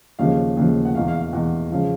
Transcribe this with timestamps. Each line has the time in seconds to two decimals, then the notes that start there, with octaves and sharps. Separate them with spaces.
0.19 D#2 C#3 F3 F5
0.57 D#2 C#3 F3
0.85 F#5
0.95 E2 B2 F5
1.08 F5
1.20 F5
1.33 E2 B2 F#5
1.71 C#3 F3 F5